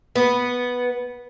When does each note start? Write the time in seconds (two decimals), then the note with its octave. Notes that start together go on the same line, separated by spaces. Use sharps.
0.15 B3